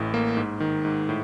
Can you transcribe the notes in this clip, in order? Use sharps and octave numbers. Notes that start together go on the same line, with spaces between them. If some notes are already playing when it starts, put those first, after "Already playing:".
Already playing: A1 A2
A#3
G#2
D#3
G#2
A2